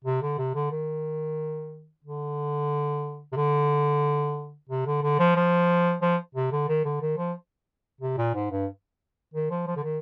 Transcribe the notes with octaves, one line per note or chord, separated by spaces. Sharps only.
C3
D3
C3
D3
D#3
D3
C3
D3
C3
D3
D3
F3
F3
F3
C3
D3
D#3
D3
D#3
F3
C3
A#2
G#2
G2
D#3
F3
F3
D3
D#3